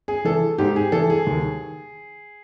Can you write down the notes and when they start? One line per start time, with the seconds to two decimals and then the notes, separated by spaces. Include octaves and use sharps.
0.08 G#4
0.25 E3 A4
0.58 G#2 G4
0.76 G#4
0.92 E3 A4
1.10 G#4
1.27 D#2